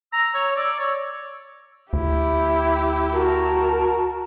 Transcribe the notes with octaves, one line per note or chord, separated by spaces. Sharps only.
A#5 E6
C#5
D5
C#5
D2 E4 G4
F#4 A#4 A5